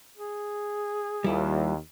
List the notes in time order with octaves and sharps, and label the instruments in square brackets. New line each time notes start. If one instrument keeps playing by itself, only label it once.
[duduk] G#4
[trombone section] D#2 [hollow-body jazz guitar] G3 E4 F4